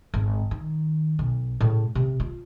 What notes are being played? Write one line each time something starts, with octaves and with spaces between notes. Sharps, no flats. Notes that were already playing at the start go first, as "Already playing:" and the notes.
G#1
D#3
B1
A2 C#3
C3
F4